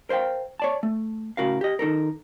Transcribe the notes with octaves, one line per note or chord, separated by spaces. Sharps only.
A#4 C5 D#5 F5 G5
C#5 D5 A5
A3
A2 C#3 F#4 A#4 F5
G4 D#5
D#3 D#4 A4 A#4